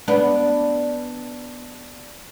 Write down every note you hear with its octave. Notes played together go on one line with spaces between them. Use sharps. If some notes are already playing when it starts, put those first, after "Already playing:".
B3 D4